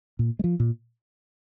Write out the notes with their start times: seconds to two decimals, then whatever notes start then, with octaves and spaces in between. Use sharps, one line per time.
0.19 A#2
0.39 G#3
0.44 F3
0.60 A#2